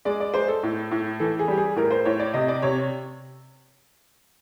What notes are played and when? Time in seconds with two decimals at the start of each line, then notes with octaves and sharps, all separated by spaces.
0.05 G#3 D5
0.20 D5
0.34 G#3 C5
0.48 A4
0.63 A2
0.91 A2
1.20 E3 A4
1.39 G#4
1.48 G3 G4
1.58 G#4
1.76 A2 A#4
1.91 C5
2.05 A2 C#5
2.19 D5
2.34 C3 D#5
2.48 D5
2.62 C3 C#5